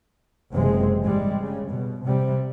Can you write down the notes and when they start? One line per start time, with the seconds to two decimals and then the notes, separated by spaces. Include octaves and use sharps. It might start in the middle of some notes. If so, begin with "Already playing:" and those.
0.52 F#1 C3 E3 G#3 C4
1.03 G#2 G3 G#3
1.41 C#3
1.70 B2
2.03 C3 G3